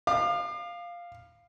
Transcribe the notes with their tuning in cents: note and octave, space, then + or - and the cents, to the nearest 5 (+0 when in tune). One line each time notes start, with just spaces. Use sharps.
F5 +0 D6 +45